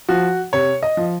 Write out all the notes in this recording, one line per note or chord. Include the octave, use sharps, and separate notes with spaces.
F3 F#4
C3 C#5
D#5
F3